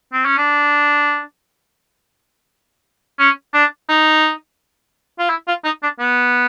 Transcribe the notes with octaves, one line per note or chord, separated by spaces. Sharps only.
C4
C#4
D4
C#4
D4
D#4
F4
E4
F4
D#4
D4
B3